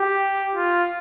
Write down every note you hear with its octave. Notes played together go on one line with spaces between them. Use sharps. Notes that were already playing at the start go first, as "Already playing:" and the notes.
Already playing: G4
F4